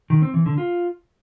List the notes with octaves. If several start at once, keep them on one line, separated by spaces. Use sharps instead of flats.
D#3
C4
E3
D3
F4